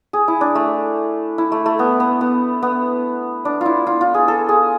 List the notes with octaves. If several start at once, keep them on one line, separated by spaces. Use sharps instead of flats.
G#4
E4
D4
A3
E4
A3
A3
B3
B3
B3
B3
D4
E4 F4
F4
F4
G#4
A4
G#4